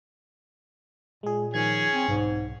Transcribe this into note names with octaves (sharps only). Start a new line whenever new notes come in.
A#2 G#3 G#4
D#3 F3 C#4 G#4 G#6
C4
B1 G#2